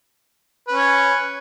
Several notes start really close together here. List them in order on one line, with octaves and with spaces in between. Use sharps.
B4 C#4 C#5